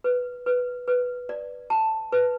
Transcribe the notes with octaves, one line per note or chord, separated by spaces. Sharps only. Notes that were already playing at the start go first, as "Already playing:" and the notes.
B4
B4
B4
D5
A5
B4